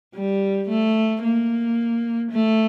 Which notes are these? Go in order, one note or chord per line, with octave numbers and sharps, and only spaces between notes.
G3
A3
A#3
A3